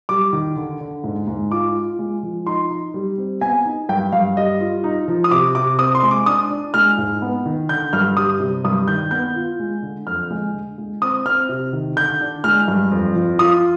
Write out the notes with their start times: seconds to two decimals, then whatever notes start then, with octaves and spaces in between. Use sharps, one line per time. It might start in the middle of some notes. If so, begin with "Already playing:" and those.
0.09 G3 D6
0.33 D#3
0.56 D3
0.81 D3
1.04 G#2
1.28 G#2
1.51 F4 D6
1.75 F4
1.99 G#3
2.23 F3
2.46 D#4 C6
2.70 D#4
2.94 G3
3.18 C4
3.41 B3 G#5
3.65 D#4
3.89 G2 G5
4.12 G2 F5
4.37 G3 D#5
4.60 F4
4.84 D#4
5.08 F3
5.24 D#6
5.31 C3 D6
5.55 C3 D6
5.79 C4 D#6
5.95 C6
6.03 G#3
6.11 D6
6.26 D4 D#6
6.50 D4
6.74 G#3 F6
6.98 G#2
7.22 B3
7.46 D#3
7.69 D3 G6
7.93 G2 F6
8.17 G3 D#6
8.40 C3
8.64 G2 D#6
8.88 D#3 G6
9.11 B3 G6
9.35 F4
9.60 G#3
9.82 D3
10.07 F2 F6
10.30 G#3
10.54 D3
10.78 G#3
11.02 C4 D#6
11.26 C4 F6
11.49 C3
11.73 D#3
11.96 D3 G6
12.21 D4
12.44 G#3 F6
12.68 G2
12.91 F2
13.15 F3
13.39 F4 D#6